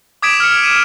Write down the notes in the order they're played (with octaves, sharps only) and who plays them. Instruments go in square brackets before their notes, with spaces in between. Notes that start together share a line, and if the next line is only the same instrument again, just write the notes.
[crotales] D6 D#6 G#6 B6 D7 E7
F6 C#7
D#7 E7